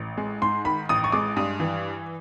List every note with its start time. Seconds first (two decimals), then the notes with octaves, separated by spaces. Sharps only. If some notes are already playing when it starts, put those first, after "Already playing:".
Already playing: A1
0.17 G#3
0.42 G#2 C6
0.65 D#3 B5
0.89 A1 D#6
1.04 C#6
1.12 G#3 D6
1.36 G2 D#6
1.60 E3